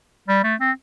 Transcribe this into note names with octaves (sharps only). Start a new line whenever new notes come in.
G3
A3
C4